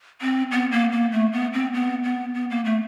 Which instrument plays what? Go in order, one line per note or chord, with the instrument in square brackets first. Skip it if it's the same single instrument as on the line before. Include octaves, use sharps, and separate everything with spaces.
[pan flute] C4
B3
A#3
A#3
A3
B3
C4
B3
B3
B3
A#3
A3